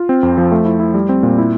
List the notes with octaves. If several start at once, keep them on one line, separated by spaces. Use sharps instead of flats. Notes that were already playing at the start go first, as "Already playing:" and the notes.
Already playing: F4
C4
F2
F3
A3
E4
E4
G3
C4
A#2
E4